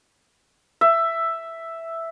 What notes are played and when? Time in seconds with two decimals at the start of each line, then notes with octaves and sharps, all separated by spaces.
0.81 E5